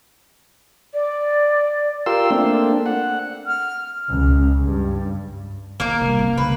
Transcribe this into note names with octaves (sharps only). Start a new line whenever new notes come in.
D5
F4 G4 A#4 C6 E6
A3 A#3 C4 D4
F#5
F6
C#2
G2
D#3 A#3 A#4
C3 G3
C4
C#2 C#3 B4